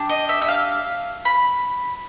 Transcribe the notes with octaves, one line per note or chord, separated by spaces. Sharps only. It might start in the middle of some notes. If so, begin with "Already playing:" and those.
Already playing: D4 G4
D#5
E5
E5
F5
B5